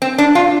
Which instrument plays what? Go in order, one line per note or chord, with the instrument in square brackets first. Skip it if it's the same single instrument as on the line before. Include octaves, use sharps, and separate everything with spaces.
[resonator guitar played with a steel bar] C4
D4
F4